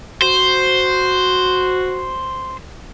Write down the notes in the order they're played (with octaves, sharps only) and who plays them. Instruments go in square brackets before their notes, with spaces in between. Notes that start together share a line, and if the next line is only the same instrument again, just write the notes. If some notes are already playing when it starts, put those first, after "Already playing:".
[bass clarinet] F#4 [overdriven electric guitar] C5